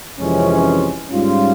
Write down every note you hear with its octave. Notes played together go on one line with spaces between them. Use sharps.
F2 C3 E3 G#3 C#4
G#2 G3 C#4 F4